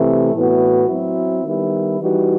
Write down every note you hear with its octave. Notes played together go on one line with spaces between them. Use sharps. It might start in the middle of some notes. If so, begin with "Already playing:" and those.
Already playing: C3 E3 A3
A2 E3 B3 F#4
F#3 C4 E4
D#3 G3 B3 E4
E3 G3 D#4 F#4